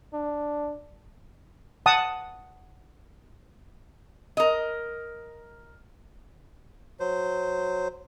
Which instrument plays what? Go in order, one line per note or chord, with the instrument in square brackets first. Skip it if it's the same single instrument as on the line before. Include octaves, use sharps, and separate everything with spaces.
[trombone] D4
[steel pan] F#5 A5 D#6
[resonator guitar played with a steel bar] A#4 D#5
[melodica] F#3 C5